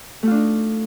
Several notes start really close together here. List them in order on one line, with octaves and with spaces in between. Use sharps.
A3 F4 D4 D#4